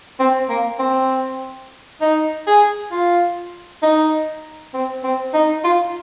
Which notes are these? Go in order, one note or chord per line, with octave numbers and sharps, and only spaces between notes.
C4
A#3
C4
D#4
G#4
F4
D#4
C4
C4
D#4
F4